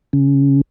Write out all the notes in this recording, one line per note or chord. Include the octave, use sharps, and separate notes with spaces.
C#3